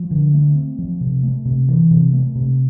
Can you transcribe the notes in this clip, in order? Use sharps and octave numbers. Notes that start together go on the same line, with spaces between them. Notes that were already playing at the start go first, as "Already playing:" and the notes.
Already playing: F3
D3
A3
C4
F3
C3
A3
C3
E3
C3
A3
C3